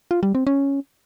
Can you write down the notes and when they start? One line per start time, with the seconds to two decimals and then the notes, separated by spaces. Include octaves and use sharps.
0.11 F4
0.23 G3
0.35 C4
0.47 C#4